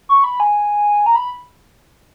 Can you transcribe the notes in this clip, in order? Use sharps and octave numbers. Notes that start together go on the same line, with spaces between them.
C#6
B5
G#5
A#5
B5